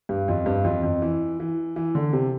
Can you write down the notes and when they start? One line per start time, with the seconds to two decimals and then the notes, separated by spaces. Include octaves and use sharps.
0.09 G2
0.28 F2
0.46 G2
0.64 F2
0.83 F2
1.02 E3
1.40 E3
1.76 E3
1.95 D3
2.13 C3